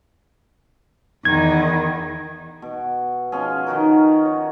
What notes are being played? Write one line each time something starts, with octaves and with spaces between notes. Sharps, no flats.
E2 D#3 G#6
B2
B2 F3 C#4 G#4
D#3 D#4 F#4 A#4
C#5